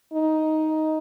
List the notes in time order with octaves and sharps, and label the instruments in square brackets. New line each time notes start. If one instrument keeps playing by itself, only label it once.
[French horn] D#4